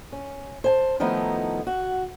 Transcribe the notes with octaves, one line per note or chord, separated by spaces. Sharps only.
C#4
C5 G#5 A5
D#3 F3 A3 B3 D#4 E4
F#4